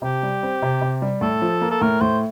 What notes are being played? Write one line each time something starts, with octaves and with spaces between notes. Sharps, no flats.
C3 G4
G3
C4
C3
C3
G3
A2 A4
F3
A#3
A4
A2 A#4
A2 C5